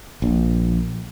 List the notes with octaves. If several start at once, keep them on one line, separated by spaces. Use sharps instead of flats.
A#1